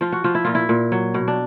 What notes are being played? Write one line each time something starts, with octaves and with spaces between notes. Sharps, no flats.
F3 F4
F#4
F3 F4
E4
A#2 F4
E4
A#2
F#3
B2
D4